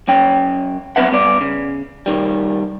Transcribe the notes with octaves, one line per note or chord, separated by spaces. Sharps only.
F#2 C#4 G5
F#3 B3 C4 B4 E5 F#5
G2 B3 D5
C#3
C2 D#3 G3